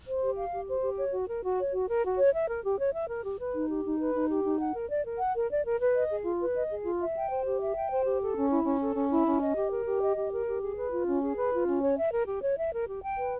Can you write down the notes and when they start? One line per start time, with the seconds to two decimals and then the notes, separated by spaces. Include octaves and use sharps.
0.08 C5
0.22 G4
0.37 F5
0.53 G4
0.68 C5
0.83 G4
0.98 C#5
1.13 F#4
1.28 A#4
1.43 F#4
1.58 C#5
1.73 F#4
1.88 A#4
2.04 F#4
2.19 C#5
2.33 E5
2.48 A#4
2.64 G4
2.79 C#5
2.94 E5
3.08 A#4
3.23 G4
3.38 B4
3.55 D#4
3.69 G4
3.84 D#4
3.99 B4
4.14 D#4
4.29 G4
4.44 D#4
4.59 F#5
4.74 A#4
4.89 D5
5.05 A#4
5.19 F#5
5.34 A#4
5.50 D5
5.64 A#4
5.80 B4
5.95 D#5
6.10 G#4
6.25 F4
6.40 B4
6.55 D#5
6.70 G#4
6.85 F4
7.01 E5
7.15 G5
7.30 C5
7.45 G4
7.60 E5
7.76 G5
7.91 C5
8.06 G4
8.21 A4
8.36 C#4
8.51 E4
8.66 C#4
8.81 A4
8.96 C#4
9.11 E4
9.27 C#4
9.41 D#5
9.56 G4
9.71 A#4
9.86 G4
10.01 D#5
10.16 G4
10.32 A#4
10.46 G4
10.62 G#4
10.76 B4
10.92 F4
11.06 C#4
11.22 G#4
11.37 B4
11.52 F4
11.67 C#4
11.82 C#5
11.97 E5
12.12 A#4
12.27 G4
12.42 C#5
12.57 E5
12.72 A#4
12.87 G4
13.02 G5
13.17 B4